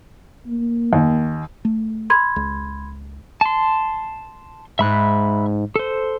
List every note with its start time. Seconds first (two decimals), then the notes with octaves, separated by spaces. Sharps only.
0.47 A#3
0.93 D#2
1.65 A3
2.10 B5 C6 G#6
2.36 C#2
3.41 A5 C6
4.79 G#2 E5 B5 F#6
5.76 A4 C5